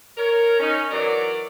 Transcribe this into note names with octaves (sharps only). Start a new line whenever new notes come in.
A#4 C#5
C#4 D#4
E3 F#3 A#4 D5